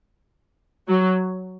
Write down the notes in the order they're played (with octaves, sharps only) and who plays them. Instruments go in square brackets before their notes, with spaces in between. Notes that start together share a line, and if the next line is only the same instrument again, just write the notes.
[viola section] F#3